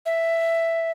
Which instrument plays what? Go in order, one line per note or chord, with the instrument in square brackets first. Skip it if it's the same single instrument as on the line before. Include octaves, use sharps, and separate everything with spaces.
[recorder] E5